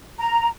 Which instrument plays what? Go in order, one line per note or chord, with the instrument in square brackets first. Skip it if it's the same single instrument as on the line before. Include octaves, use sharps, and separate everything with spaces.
[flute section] A#5